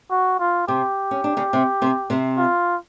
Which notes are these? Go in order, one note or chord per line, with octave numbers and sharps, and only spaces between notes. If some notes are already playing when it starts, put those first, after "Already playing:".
F#4
F4
C3 C4 G4
C#4
D4
C#3 C#4
C3 C4
C3 C4
C3 C4
F4